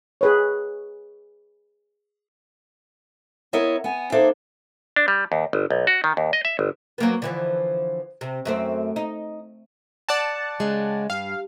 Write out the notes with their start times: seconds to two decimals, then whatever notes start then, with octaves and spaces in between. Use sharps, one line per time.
0.21 G#4 B4 C#5
3.53 B3 E4 A#4 C#5 D#5
3.84 B3 G#5
4.12 A#3 D4 D#4 A4 C5 E5
4.96 D4
5.08 G3
5.32 D#2
5.53 G1
5.70 B1
5.87 F#4
6.04 D#3
6.17 D#2
6.33 D#5
6.45 E5
6.59 G1
6.98 F#3 A#3 B3
7.22 D3 E3 F3
8.21 C3
8.45 F#2 A3 C4
8.96 D#4
10.09 D5 F#5 A5
10.60 C#3 G#3
11.10 G2 F5